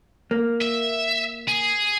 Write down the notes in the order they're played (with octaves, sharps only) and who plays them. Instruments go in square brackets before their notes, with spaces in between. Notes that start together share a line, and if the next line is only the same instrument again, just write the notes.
[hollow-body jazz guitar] A#3
[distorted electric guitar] E5
G#4